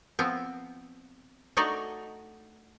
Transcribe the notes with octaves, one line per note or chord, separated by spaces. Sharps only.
F3 B3 C4
A3 D4 D#4 F#4 D5 D#5